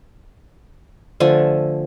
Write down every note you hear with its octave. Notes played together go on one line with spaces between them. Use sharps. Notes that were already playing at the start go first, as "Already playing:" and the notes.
D3 F3 A3 G#5